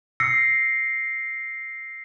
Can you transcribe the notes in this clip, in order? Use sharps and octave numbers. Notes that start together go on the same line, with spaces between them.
E6 A#6 C7 C#7